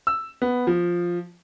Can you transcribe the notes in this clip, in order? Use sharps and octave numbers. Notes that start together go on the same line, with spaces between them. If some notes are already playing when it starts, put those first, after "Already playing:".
E6
B3
F3